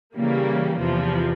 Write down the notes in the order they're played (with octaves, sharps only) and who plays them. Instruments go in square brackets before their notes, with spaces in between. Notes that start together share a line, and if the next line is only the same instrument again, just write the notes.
[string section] C#3 E3 G3 A#3
E2 C3 F3